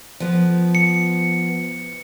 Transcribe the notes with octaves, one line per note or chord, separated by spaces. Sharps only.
F3 B3
C#7